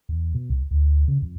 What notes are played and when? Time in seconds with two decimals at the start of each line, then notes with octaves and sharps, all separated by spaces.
0.09 E2
0.34 B2
0.50 C2
0.71 D2
1.08 C#3
1.22 F2